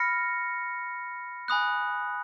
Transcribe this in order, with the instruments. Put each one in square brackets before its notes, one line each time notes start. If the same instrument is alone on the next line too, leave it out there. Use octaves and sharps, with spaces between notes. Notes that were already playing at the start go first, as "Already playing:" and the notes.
Already playing: [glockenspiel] B5 F6 A#6 C#7
G#5 B5 D#6 F#6